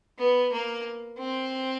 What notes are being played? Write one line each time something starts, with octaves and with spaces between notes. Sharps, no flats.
B3
A#3
C4